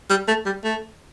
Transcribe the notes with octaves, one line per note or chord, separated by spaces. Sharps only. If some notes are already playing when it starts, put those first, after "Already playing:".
G3
A3
G3
A3